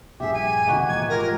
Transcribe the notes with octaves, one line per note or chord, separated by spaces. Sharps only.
A#1 G2 G4 G#4 E5
G#5
C#2 C3 D#3 G#3 A#3 F#4
A#2 E3 G#6
G#2 F4 G4 A#4